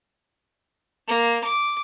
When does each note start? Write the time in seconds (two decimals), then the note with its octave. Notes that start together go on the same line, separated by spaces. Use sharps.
1.08 A#3
1.44 D6